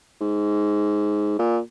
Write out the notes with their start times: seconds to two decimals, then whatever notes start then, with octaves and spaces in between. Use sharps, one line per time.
0.21 G#2
1.39 A#2